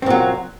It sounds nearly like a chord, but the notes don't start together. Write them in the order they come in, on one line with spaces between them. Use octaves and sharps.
C4 A#2 F#3